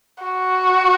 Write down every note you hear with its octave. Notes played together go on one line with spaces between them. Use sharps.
F#4